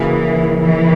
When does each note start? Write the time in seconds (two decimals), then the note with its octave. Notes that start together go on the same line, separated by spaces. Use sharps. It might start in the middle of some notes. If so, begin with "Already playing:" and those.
Already playing: C#3 E3 F#3 A#3 E4 G#4
0.61 E3